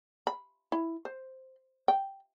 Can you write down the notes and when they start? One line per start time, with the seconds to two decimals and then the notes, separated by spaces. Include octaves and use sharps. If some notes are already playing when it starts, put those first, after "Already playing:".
0.27 B5
0.72 E4
1.05 C5
1.88 G5